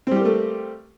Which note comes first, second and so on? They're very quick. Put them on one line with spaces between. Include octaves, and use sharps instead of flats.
C4 G3 G4 A#3 A3